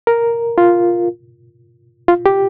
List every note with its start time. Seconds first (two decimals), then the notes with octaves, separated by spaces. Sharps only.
0.07 A#4
0.58 F4
2.08 F4
2.26 G4